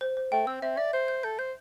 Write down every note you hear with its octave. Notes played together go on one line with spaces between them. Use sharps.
C5
C5
A3 G5
C4 E6
C4 E5
D5 E5
C5 G6
G6
A4 G6
C5 G6